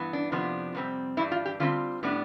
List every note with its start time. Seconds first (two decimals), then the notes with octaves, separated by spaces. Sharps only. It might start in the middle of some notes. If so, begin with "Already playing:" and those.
Already playing: G2 E3 B3
0.13 D4
0.32 F2 C3 F3 B3 D4
0.75 F2 C3 G3 C4
1.17 G2 E3 G3 D4 E4
1.31 F4
1.45 G4
1.60 D3 G3 C4 F4
2.03 A2 G3 B3 D4